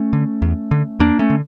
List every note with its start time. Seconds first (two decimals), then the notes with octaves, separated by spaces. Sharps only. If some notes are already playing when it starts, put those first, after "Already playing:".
Already playing: A3 C#4
0.13 D3
0.42 E2
0.71 D3
0.99 E2 A#3 D4
1.19 A3 C#4
1.30 D3